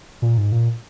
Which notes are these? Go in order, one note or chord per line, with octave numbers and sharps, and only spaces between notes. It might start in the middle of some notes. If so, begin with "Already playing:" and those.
A#2
G#2
A#2